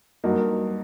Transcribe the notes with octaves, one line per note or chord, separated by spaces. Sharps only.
G2 F#3 A#3 D#4